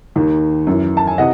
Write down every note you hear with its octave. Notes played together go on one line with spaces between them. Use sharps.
D#2 D#3
F#2 E3
A5
G#5
C3 E3 D#5 F#5